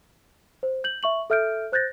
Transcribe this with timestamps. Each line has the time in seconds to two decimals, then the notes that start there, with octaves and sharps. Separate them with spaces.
0.63 C5
0.84 G6 F#7
1.03 E5 C#6 F#7
1.30 A4 E5 F6 G6 D7
1.72 C5 F#6 G6 A6 A#6